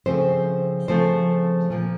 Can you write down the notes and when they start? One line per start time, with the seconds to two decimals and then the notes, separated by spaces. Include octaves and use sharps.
0.06 C#3 F3 A3 C4 C5
0.88 C#3 F3 A3 C4 C5
1.70 A#2 F3 A#3